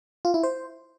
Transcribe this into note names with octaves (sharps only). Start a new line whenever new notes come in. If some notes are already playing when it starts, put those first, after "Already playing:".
F4
E4
C5